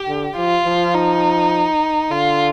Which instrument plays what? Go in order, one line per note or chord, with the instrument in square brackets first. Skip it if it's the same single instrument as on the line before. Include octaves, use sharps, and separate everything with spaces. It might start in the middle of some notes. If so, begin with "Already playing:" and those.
Already playing: [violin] G4
[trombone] D3
[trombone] F3 [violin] F4
[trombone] F3
[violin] D#4
[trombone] D3 [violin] F4